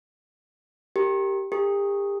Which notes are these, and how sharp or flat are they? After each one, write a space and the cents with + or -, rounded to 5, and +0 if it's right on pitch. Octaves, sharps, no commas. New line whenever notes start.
G4 +0 A#4 -15
G4 +40 A#4 -45